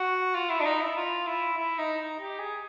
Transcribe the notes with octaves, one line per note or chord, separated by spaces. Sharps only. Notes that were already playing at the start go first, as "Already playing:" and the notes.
Already playing: F#4
F4
E4
D4
D#4
E4
F4
E4
E4
D#4
D#4
G4
G#4